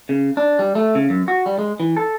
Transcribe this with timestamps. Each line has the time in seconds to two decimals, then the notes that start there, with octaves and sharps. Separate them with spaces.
0.09 C#3
0.37 D4
0.59 G3
0.75 A3
0.95 C#3
1.10 F#2
1.28 F#4
1.46 G3
1.59 G#3
1.80 E3
1.97 A4